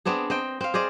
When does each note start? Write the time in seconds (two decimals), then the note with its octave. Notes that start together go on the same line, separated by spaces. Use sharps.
0.05 B3 C4 D4 G#4
0.30 C4 D#5 G5
0.61 C4 F5
0.74 G#4 C5 D5 D#5